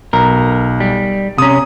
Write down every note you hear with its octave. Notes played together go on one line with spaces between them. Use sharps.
B1 A#4
G3
C3 C#4 A#5 D#6